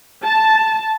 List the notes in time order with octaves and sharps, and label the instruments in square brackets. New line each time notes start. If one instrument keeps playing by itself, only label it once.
[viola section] A5